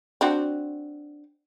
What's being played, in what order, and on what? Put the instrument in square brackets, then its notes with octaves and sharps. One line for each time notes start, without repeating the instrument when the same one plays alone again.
[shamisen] C4 D4 F#4